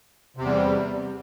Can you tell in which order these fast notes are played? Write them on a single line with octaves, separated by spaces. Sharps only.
C3 E2 G3